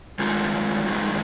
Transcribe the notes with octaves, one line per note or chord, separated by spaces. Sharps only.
G2 D#3 G#3 F4
G2 D#3 G#3